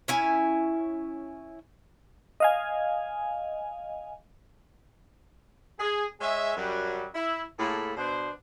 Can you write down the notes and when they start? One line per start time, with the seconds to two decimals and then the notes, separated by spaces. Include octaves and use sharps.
0.08 C#4 E4 G#5
2.40 D#5 F5 G#5
5.79 G#4
6.21 G#3 G#4 C#5 D#5 E5
6.56 F#2 F#3 G3
7.14 E4
7.59 A2 A#3 F4 G#4 A4 B5
7.97 B2 D4 C5